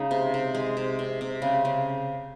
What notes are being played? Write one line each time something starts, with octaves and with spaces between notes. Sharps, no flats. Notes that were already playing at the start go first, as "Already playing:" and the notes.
Already playing: C#3 G#3 D#4
C3
C3
G#3
C3
C3
C3
C#3
C#3